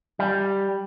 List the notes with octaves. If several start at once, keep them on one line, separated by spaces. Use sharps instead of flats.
G3